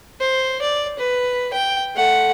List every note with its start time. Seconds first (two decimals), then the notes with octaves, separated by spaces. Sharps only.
0.20 C5
0.62 D5
0.99 B4
1.53 G5
1.96 A3 F#5